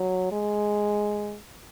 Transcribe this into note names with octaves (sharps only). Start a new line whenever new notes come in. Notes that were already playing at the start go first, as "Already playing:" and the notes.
Already playing: F#3
G#3